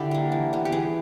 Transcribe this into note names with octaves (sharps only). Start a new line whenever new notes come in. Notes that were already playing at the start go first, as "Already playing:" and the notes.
Already playing: D3 D4 E4 G4
G3 A#3
E3
G3 B3
G4
E3 G#4